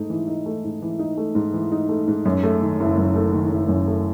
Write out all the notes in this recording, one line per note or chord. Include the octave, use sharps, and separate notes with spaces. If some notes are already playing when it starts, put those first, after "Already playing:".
Already playing: G#2 A3 D#4
E3
D#4
A3
G#2
E3
D#4
A3
G#2
E3
D#4
A3
G#2
F#2
A3
D#3
F#1
F#2
A3
D#3
F#1
F#2
A3